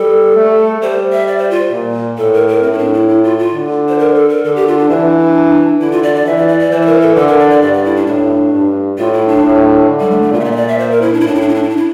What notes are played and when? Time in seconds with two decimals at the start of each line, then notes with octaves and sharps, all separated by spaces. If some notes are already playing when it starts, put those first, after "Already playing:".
Already playing: G3 A4
0.36 A3
0.82 G3 C5
1.12 E5
1.27 D5
1.38 C5
1.51 F4
1.72 A#2
2.18 A2 A4
2.33 A#4
2.48 A#4
2.63 A2 C4
2.73 E4
2.78 D4
2.94 E4
3.09 E4
3.23 F4
3.39 F4
3.54 D3
3.89 C5
3.99 A#4
4.15 A4
4.29 A#4
4.44 D3 A4
4.56 G4
4.68 F4
4.78 D4
4.90 E3 D4
5.80 D3 E4
5.92 F4
6.03 D5
6.15 D5
6.26 E3 E5
6.37 D5
6.48 D5
6.59 D5
6.71 E3 C5
6.82 C5
6.86 A#4
7.01 A4
7.16 D3 A4
7.28 A#4
7.39 D5
7.50 D5
7.62 G2 D5
7.73 D5
7.85 E4
7.96 D4
8.07 A2 D4
8.52 G2
8.98 A2 F4
9.13 E4
9.28 D4
9.43 A2
9.89 D3
10.00 G3
10.11 A3
10.22 A3
10.33 A#2 F4
10.40 E5
10.45 D5
10.51 E5
10.57 D5
10.68 E5
10.79 C5
10.91 A#4
11.02 E4
11.13 D4
11.20 E4
11.24 A2 D4
11.35 E4
11.41 D4
11.48 E4
11.55 D4
11.63 E4
11.69 D4
11.77 E4